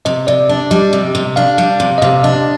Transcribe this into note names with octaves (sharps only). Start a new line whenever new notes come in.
C3 D#5
C3 D5
D4
G3 D#5
C3
C3
D4 F5
G3
C3
D#5
C3 F5
D4 D#5